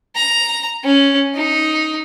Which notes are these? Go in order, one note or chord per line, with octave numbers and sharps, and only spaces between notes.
A#5
C#4
D#4